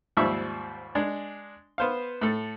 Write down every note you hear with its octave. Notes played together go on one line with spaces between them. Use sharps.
D#2 G#2 F3 G3 E5 C#6
G#3 D4
B3 C5 F5
A2 A4